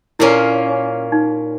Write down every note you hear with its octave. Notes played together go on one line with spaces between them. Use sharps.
A#2 A#3 C#4 E4
D#4